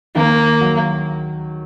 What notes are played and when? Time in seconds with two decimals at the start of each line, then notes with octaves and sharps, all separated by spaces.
0.15 D#3 A#3
0.61 F#3